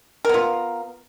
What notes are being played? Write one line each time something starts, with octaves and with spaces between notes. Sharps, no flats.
B3 F4 A#4